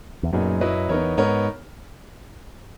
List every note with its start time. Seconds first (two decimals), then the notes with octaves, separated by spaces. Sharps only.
0.23 E2
0.32 F#2 A#2 F#3 B3 D#4 G#4
0.61 F#3 C#4 E4 B4 D#5
0.89 E2 B3 D#4 A#4 C#5
1.17 G#2 B3 D#4 A#4 C#5